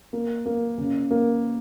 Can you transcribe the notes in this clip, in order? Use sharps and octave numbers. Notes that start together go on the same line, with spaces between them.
A#3
A#3
C#3
A#3